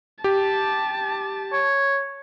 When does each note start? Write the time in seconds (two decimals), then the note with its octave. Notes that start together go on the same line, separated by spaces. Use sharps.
0.24 G4 A5
1.53 C#5